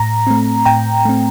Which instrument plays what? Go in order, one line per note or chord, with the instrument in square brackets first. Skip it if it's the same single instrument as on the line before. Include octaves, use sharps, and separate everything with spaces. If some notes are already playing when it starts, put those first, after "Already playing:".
Already playing: [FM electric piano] A2 A#5
A3 C4
A2 G5 A#5
A3 C4